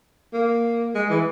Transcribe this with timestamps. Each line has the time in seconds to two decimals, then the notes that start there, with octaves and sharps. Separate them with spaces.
0.33 A#3
0.94 G#3
1.10 E3